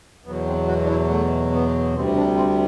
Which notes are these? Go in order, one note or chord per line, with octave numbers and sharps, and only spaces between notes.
E2 B2 F#3 B3
C4
F#4
D4
E4
A3
B3
D2 C3 G3 C4
D4
C4